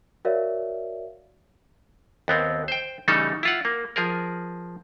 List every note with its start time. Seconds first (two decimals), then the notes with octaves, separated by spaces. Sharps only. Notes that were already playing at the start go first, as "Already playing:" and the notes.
0.25 F#4 A#4 C#5 D5 E5 F5
2.28 D#2 B3 C4
2.68 C5 G5
3.08 C#3 E3 G3 A3 D#4 A4
3.43 E4 F4 F#5
3.65 A#3
3.96 F3 G#4 A#4